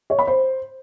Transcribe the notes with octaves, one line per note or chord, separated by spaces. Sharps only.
C#5
B5
C5